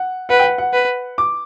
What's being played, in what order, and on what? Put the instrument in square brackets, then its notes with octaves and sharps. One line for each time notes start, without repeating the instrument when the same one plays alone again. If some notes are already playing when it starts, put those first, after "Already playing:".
Already playing: [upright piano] F#5
[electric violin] B4 [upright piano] F#5
[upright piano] G5
F#5
F#5
[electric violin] B4
[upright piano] D6